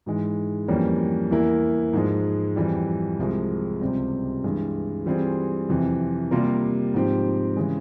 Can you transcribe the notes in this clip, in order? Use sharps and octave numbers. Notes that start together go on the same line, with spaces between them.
G#2 E3 G#3
F2 E3 G3 A#3 C#4
E2 E3 A#3 E4 A#4
G#2 F3 G#3
F2 E3 G3
C2 C3 F3 G#3
C#2 C3 G3 C4
G2 E3 G#3
E3 G3 C4 F4 G#4
F2 C3 E3
C3 G3 A#3 F4 A#4
G#2 F3 C4 G4
C#3 E3 G#3